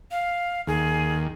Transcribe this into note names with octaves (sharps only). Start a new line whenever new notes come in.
F5
D#2 G#4